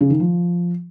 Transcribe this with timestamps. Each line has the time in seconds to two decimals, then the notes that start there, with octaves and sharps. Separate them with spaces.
0.01 C#3
0.10 D#3
0.20 F3